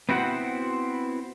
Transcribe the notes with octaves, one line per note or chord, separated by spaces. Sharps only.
B3 C4 E4 F#4 C5 F#5